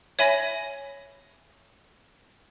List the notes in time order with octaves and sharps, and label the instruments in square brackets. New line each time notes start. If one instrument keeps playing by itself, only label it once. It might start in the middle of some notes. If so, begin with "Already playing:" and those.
[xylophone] C#5 E5 G#5 B5 A#6